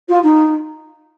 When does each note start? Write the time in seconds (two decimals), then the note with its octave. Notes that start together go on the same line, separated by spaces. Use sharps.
0.09 F4
0.23 D#4